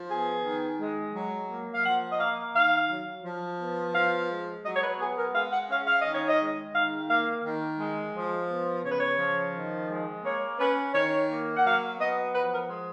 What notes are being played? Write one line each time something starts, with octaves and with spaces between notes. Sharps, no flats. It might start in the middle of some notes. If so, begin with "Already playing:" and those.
Already playing: F3
B3 G#4
D#3
G#3
F#3
A#3
F5
F3 F#5
D#5
A#3 F5
D#3 F5
F#3
F3
B3
F3 F5
G#3
F#3 D#5
C#5
B4
B3 G#4
A#4
G#3 F5
F#5
C#4 F5
F5
D#3 D#5
C#5
D#5
G#3
D#3 F5
A#3 F5
D#3
G#3
F3
B3
C#3 C#5
B4
C#5
F3
D#3
G#3
A#3 C#5
C#4 B4
D#3 C#5
A#3
F#5
F#3 F5
B3 D#5
F3 B4
A#4
G#3